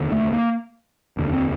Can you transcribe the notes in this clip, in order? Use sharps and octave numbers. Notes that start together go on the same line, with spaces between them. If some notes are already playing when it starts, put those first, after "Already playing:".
Already playing: F1 D#2 D3
A3
A#3
F1 D#2 D3
C4